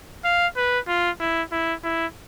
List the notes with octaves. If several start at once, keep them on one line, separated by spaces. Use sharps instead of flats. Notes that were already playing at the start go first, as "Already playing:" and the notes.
F5
B4
F4
E4
E4
E4